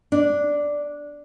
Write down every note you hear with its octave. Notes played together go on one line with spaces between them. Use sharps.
D4